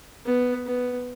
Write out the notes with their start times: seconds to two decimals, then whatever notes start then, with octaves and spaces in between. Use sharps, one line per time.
0.26 B3
0.66 B3